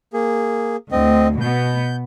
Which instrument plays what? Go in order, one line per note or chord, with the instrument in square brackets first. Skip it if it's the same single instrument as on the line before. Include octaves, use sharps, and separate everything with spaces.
[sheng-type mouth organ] A#3 G#4
[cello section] D2 [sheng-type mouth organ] C4 D#5
[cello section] B2 B3 [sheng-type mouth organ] G6